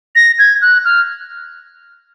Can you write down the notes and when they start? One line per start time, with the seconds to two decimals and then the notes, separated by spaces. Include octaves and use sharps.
0.15 A#6
0.39 G#6
0.62 F#6
0.85 F6